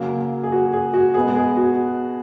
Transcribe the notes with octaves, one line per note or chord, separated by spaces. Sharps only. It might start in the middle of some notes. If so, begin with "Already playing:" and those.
Already playing: C#3 F#3 A#3 G#4
G#4
F#4
G#4
F#4
B2 G#3 B3 G#4
G#4
F#4